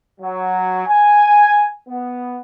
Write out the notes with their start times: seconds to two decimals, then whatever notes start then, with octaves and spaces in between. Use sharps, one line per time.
0.20 F#3
0.86 G#5
1.87 B3